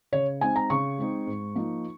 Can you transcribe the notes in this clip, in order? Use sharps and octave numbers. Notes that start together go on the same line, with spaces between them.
C#3 C#5
G#3 C4 D#4 G#5
A#5
C#3 C#6
G#3 C4 D#4
G#2
F3 A#3 D#4